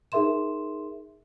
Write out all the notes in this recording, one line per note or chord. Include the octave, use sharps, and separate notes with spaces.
D#4 G#4 A#4 E5 C6 E7